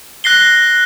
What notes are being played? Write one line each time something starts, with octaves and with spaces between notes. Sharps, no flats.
F#6 A#6 C7 G7